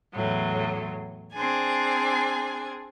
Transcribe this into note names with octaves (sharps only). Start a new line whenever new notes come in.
E2 A2 F#3
C4 D4 G#4 G#5